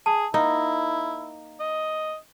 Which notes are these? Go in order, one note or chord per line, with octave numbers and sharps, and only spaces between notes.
G#4 A5
A#3 D#4 E4
D#5